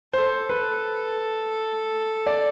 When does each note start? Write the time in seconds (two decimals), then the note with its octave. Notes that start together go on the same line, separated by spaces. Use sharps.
0.13 A4 C5
0.49 B4
2.27 D5